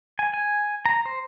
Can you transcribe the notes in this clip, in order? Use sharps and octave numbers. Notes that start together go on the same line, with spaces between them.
G#5
G#5
A#5
C5